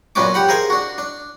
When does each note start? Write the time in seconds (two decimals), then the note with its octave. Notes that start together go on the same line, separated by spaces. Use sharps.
0.15 F#2 A#2 B3 C#4 D4 D6
0.34 G4 F#5 B5
0.49 G#4 A#4 C5 F5 G#5
0.70 D4 F#4
0.98 D4